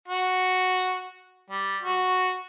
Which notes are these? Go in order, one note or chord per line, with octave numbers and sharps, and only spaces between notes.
F#4
G3
F#4